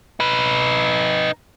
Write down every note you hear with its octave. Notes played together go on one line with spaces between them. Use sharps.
D#4 B4